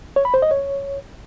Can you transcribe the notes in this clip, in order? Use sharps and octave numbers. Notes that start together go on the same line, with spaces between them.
C#5
B5
C5
D#5
C#5